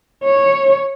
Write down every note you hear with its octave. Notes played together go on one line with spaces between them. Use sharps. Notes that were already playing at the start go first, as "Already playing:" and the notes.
C#5